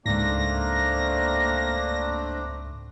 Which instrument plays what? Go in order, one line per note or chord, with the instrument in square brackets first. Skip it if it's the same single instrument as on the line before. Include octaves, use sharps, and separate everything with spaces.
[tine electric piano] C#2 G#2 [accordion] A3 C4 D4 [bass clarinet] A#3 [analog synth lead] A#6